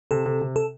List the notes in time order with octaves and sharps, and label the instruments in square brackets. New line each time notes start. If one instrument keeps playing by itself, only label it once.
[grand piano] C3 [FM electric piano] A4
[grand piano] C3
C3
[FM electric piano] A4